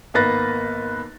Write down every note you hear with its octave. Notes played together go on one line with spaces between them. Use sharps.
G#1 A#3 B3 B4 A6 A#6